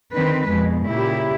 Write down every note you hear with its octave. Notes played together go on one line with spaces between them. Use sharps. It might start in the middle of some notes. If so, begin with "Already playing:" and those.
D3 D#3 C4 B4
F2 B2 G#3
A#2 C#3 E4 G4